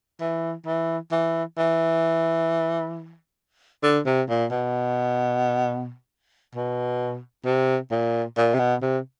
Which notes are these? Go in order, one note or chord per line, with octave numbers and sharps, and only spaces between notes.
E3
E3
E3
E3
D3
C3
A#2
B2
B2
C3
A#2
A#2
C3
B2
C3